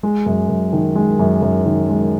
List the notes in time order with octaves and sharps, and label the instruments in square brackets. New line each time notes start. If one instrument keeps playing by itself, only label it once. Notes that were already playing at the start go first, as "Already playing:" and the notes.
[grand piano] G#3
F#2
F#2
D#3
G#3
F#2
F#2
D#3
G#3